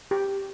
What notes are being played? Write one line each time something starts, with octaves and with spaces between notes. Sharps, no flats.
G4